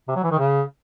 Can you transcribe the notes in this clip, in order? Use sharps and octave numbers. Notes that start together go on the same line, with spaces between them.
C3
F#3
E3
D#3
C#3